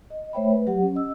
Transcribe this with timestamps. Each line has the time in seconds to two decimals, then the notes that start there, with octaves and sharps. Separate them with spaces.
0.10 D#5
0.33 A3 C5 C#5 E5 G5 B5
0.50 B4
0.67 F#3 G4 F#5
0.82 C#4
0.95 D#5 E6